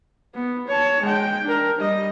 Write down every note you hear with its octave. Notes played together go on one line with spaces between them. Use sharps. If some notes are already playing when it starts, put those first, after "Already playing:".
B3
C#5 A5
G#3 G5
D4 A#4
G3 D#5